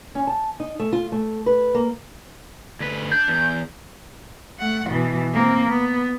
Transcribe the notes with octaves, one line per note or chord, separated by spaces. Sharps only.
C#4
A5
D#4
A3
F4
A3
B4
A#3
D2 B4
D4 G6
E2
A3 F#5
B2 E3
A#3 C4
B3